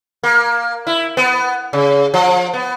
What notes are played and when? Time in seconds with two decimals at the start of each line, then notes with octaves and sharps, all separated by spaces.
0.23 A#3
0.87 E4
1.17 B3
1.73 C#3
2.14 F3
2.54 B3